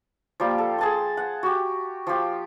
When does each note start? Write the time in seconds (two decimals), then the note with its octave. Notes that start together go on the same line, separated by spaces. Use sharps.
0.40 F3 G3 A#3 G4
0.58 A4
0.78 G#4 A5 C6
1.17 F#5
1.43 F#4 G4
2.07 F3 G4